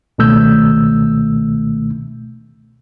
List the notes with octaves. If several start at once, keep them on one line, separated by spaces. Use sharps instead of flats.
C#2 B2 D#3 A3 E6 G6